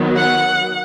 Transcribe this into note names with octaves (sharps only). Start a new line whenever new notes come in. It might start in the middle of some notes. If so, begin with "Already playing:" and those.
Already playing: D#3 F#3 B3
F#5